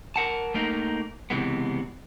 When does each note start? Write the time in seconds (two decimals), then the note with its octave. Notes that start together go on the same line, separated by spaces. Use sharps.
0.16 A#4 F#5 A5
0.54 A3 A#3 D#4 A#4
1.30 C#2 C3 E3 G#3 B3